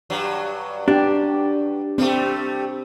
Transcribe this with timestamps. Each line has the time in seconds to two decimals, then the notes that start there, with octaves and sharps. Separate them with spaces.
0.10 G2 F#3
0.88 D4 G4
1.98 G3 A3 C4